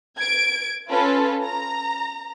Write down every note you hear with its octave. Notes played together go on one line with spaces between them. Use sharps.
G#6 D7
C#4 F4 A4 B4
A#5